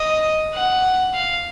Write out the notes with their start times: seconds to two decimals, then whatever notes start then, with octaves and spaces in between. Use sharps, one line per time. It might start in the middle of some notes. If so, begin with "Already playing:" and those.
Already playing: D#5
0.55 F#5
1.14 F5